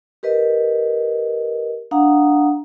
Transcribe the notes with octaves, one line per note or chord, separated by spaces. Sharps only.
G4 A#4 B4 D#5
D4 F5 F#5 A#5 D#6